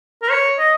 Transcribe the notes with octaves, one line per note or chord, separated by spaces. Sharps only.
A#4
C#5
D#5